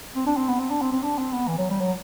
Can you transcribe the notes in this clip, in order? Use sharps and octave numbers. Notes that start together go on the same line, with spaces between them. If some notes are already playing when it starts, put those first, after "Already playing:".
C4
D4
C4
B3
C4
D4
C4
C4
D4
C4
B3
E3
F#3
G3
F#3